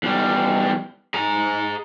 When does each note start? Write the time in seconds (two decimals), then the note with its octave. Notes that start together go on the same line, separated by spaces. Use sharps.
0.03 E2 G3
1.14 G#4 A#5